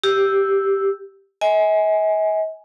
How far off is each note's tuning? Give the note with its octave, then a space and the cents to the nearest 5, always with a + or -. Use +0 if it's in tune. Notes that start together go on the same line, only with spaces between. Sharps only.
G4 +0 E6 +0
D#5 +45 G#5 +0